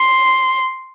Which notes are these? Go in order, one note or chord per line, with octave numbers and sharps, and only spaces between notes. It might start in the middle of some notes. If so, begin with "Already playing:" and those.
Already playing: C6